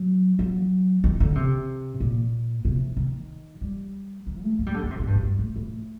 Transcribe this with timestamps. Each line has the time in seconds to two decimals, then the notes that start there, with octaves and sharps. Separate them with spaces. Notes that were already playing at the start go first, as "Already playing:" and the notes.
Already playing: F#3
0.39 F#3
1.04 D#3
1.20 D3
1.35 C3
2.00 A#2
2.65 C3
2.97 D#3
3.61 G3
4.27 D#3
4.42 A3
4.59 A#3
4.66 G3
4.74 D3
4.83 D#3
4.91 C3
4.99 A#2
5.07 G2
5.15 F#2
5.22 G2
5.39 A2
5.56 A2